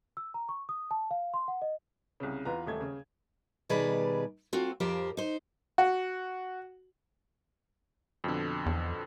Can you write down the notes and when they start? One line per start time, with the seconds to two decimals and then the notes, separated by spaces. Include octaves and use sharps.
0.17 E6
0.34 A#5
0.49 C#6
0.69 D#6
0.91 A5
1.11 F5
1.34 C6
1.48 F#5
1.62 D#5
2.20 C2 C#3
2.45 E2 F4 B4 A#5
2.66 D#1 A3 G#6
2.81 C#3
3.69 B2 D#3 G3 G#4 B4 D5
4.53 C4 F4 F#4 A4
4.80 F2 F3 G4 A#4 C5
5.17 D#4 C5
5.78 F#4
8.24 F2 B2 D3
8.66 E2